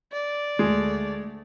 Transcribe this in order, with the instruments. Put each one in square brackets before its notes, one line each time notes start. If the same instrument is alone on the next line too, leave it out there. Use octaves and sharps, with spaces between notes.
[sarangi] D5
[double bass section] D2 A3 [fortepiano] G#3